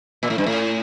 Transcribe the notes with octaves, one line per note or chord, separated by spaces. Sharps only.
A#2
A2
G2
A2